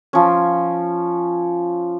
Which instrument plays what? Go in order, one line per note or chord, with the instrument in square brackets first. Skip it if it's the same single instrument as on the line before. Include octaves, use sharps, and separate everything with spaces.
[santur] F3 C#4